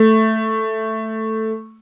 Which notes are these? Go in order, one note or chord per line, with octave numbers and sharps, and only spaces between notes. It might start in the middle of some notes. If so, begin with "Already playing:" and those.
Already playing: A3